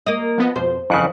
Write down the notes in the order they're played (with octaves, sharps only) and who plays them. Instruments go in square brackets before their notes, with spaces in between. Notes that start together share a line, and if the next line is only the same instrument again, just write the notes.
[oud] A#3 D#5
[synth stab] F3 B3 D#5
[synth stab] F2 B2 F3 [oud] C5
[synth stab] G1 E3 F#6 [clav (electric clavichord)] F2 C#3